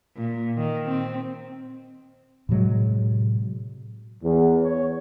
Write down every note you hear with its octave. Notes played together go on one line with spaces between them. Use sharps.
A#2
D#3
C4
A2 C3 F#3 G#3
E2
C#5